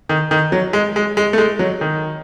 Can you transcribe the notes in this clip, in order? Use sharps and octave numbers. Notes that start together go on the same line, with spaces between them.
D#3
D#3
F#3
G#3
G#3
G#3
A3
G#3
F#3
D#3